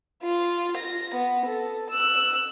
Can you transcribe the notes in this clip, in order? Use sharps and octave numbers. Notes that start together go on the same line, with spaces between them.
F4
A#6
B3
A4
E6 F#6